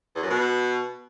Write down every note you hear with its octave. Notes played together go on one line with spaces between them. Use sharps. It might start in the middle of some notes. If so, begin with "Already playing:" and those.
E2
F#2
B2